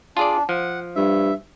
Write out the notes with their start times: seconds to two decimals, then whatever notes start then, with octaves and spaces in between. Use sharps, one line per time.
0.17 D4 F4 G#4 D5
0.49 F3 F#5
0.96 G2 E5